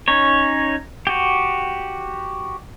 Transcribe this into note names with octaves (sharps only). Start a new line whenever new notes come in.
C#4 D#4 C#5
F#4 G4